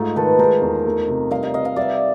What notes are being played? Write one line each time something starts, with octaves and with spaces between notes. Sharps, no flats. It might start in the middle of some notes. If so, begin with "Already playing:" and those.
Already playing: G#2 A3 D#4 F4
D#3 A4 B4
G#3 A#4 C5
E2
A3
C3
G3 D#5 F5
D#5 F5
C3 D#5 F5
D#5 F5
G3 D5 E5